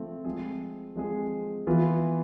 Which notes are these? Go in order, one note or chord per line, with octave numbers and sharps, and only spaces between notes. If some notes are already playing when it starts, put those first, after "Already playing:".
Already playing: F3 A3 C4
F3 G#3 C4 G#4
F3 G#3 C4 G#4
E3 B3 F4